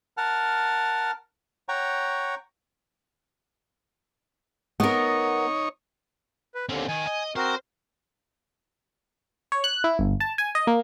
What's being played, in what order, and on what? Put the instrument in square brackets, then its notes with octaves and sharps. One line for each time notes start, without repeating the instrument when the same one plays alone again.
[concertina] A#4 F#5 A5 F6
C#5 F#5 G5 A#5 C#6
[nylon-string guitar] B3 A#4 [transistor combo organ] D#4 C#5
[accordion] B4
[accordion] D#2 D3 [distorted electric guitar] C4 C#4
[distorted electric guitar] D#3 [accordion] G#5
[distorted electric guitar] D#5
[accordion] C4 F#4 A#4 [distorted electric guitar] C5
[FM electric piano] C#5
F#6
E4
G1
A5
G#5
D#5
A#3